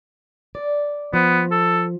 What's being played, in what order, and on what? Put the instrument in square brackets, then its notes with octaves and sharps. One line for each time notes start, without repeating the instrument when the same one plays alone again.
[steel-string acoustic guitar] D5
[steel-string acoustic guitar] F3 [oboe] B3
[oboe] A4